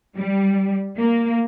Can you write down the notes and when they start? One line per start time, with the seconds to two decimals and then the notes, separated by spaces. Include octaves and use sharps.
0.17 G3
0.98 A#3